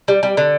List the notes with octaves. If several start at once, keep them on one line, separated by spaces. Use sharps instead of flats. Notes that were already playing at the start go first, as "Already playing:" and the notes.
G3
G3
D3